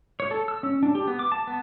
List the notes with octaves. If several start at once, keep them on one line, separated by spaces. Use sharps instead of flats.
C#5
A4
E6
C#4
D4
G4
B3
D6
A5
B3